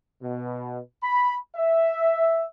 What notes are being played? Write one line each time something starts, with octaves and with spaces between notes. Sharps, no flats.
B2
B5
E5